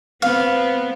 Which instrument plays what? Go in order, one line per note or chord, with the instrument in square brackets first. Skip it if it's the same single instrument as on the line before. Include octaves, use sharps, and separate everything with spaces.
[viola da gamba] B3 C4 [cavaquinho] F5